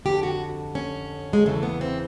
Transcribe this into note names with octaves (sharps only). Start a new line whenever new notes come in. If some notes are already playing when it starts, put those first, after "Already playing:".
F2 D3 G4
F#4
C#4
G#3
E2 C#3 E3 A3
B3
C4